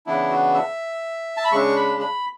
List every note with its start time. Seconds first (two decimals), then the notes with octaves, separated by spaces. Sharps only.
0.06 C#3 E3 B3 D4 E4
0.31 F#4
0.55 E5
1.37 A5
1.45 B5
1.52 C#3 G#3 D4 C#6
1.76 B5
2.00 B5